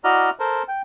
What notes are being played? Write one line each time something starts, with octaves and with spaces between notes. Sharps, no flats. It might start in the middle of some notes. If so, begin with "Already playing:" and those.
E4 F#4 D5 D#5 A#5 F6
A4 A#4 C5
G5